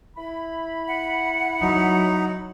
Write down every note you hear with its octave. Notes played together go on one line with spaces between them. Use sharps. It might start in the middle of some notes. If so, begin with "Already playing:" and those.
E4 B5
F#5
F#3 D#4